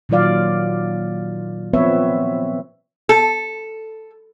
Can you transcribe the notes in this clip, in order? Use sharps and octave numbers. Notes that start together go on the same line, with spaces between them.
A#2 D#3 F#3 F4 D5 F5
F3 B3 C4 B4 C#5 E5
A4